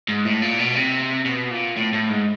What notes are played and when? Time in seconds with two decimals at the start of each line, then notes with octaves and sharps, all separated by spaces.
0.08 G#2
0.25 A2
0.42 A#2
0.59 B2
0.75 C3
1.25 B2
1.51 A#2
1.76 A2
1.93 A2
2.10 G#2